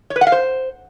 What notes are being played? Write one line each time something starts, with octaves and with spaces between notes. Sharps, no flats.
C#5
B4
F#5
F5
C5